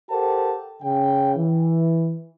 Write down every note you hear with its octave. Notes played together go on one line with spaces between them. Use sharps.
G4 A4 A#4 C5 F#5 A5
C#3 G5
E3